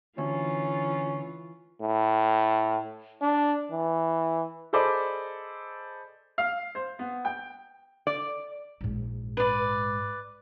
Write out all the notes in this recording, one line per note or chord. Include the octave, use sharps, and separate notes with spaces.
D2 E3 C#4 F4
A2
D4
E3
G#4 A4 C5 D5 D#5 B5
F5
C5
B3
G5
D5
A#1 G#2
B4 D5